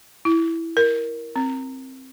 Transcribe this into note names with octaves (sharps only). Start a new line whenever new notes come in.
E4
A#4
C4